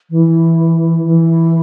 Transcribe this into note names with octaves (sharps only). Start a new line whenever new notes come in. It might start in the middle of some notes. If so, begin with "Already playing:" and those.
E3
E3